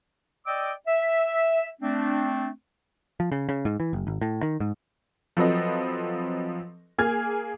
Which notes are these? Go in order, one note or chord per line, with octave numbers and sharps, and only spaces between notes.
D5 D#5 G5 D6 E6
E5
A3 C4 D4
F3
C#3
C#3
G#2
E3
F#1
G#1
A2
D#3
G#2
F3 F#3 C4 A4 B4 D#5
A#3 G#4 G#5 F6 G#6